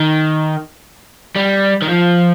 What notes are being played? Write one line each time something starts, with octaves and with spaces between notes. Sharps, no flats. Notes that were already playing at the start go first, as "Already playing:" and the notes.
Already playing: D#3
G3
D#3
F3